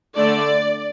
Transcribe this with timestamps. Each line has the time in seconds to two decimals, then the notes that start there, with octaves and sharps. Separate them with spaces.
0.15 D3 A3 D4 D5